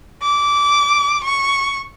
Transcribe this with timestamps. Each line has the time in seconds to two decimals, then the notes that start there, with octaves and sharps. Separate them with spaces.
0.22 D6
1.23 C#6